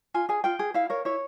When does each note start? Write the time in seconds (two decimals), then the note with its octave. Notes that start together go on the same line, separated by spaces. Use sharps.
0.14 F4 G#5
0.29 G#4 G#5
0.44 F4 G5
0.59 G#4
0.74 E4 F5
0.90 A#4 C#5
1.05 E4 C#5